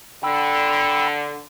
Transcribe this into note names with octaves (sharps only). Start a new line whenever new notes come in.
D3 G5 B5 E6